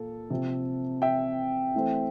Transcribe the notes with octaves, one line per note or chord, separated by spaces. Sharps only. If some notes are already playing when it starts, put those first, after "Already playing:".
Already playing: A#2 A#3 A4
C3 F3 C4
E5 G5
E3 A3 C4